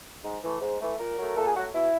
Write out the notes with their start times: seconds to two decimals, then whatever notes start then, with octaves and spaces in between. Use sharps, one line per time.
0.24 G#2
0.43 E3 A3
0.61 G#2
0.81 E3 A3
0.99 A#2 A#4
1.18 F#3 A3
1.36 A#2 A4
1.46 G#4
1.56 F#3 A3 F#4
1.74 B2 E4